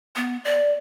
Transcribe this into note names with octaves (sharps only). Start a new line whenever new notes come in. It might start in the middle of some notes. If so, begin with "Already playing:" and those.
B3
D5